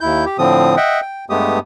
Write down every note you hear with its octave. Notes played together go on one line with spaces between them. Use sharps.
D#2 E4 G6
G4
A2 D3 F3 C4 D#6
D#5 E5 F#5 G5
G5
G2 G#3 A3 B3 G4 D#6